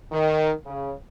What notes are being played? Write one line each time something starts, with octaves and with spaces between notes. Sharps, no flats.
D#3
C#3